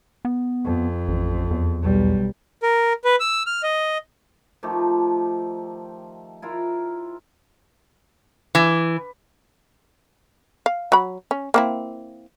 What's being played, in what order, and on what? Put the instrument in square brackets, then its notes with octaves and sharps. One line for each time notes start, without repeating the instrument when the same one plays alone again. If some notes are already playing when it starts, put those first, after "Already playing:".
[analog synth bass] B3
[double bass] F2
[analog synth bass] A1
E2
[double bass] B1 G3
[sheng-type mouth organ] A#4
B4
E6
F6
D#5
[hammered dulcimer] D#3 F3 A3 G4
E4 F4 A#4
[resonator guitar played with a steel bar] E3
[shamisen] F5
F#3 B5
C#4
A#3 C4 E4